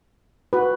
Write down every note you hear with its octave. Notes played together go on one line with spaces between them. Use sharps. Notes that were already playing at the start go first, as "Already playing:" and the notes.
F#4 B4